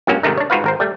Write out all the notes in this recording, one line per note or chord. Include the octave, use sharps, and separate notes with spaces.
G2 A#2 F#3 A#3 C#4
G#2 C3 D#3 A3 D#4
D4 C#5
G#2 F4 F#4 B4 F5
G#1 A#4 C5
G3 A3